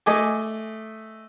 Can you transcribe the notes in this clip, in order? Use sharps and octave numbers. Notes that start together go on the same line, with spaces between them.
A3 D#5 G#5 D6